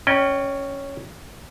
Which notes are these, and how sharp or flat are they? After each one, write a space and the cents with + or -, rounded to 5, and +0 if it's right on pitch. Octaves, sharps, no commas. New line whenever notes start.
C#4 +0 D#5 -45 G5 +0